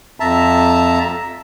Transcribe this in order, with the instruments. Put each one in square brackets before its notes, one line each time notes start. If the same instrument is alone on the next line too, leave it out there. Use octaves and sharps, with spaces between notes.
[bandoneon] F2 E5 A5 A#5